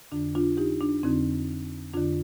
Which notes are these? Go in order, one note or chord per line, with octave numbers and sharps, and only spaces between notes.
F2 D3 D4
D4 F4
D#4 G4
D4
F2 D3 C4 D#4
F2 D3 D4 F4